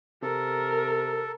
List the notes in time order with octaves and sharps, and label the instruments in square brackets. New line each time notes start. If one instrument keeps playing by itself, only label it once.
[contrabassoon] C3 [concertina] A4 [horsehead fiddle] A#4